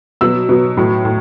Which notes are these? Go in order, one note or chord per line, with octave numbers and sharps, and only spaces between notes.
B2 F#3 E6
B2 F#3
A2 F#3
A2